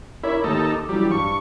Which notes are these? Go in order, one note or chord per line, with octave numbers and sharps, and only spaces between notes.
E4 A#4 C#5 D6
D#2 D#4 A4
D6
E3 F#3 G3
G2 C#6